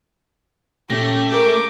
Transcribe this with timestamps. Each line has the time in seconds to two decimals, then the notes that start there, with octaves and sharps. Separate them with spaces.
0.90 A#2 A3 C#4 G4 A#6
1.32 G#4 A#4 D6 G6